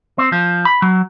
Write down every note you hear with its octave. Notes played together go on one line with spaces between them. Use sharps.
C4
F3
B5
F#3